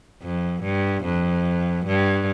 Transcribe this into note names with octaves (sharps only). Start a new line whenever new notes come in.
F2
G2
F2
G2